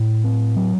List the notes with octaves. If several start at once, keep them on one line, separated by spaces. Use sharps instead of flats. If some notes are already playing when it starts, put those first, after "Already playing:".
Already playing: A2
C4
F#3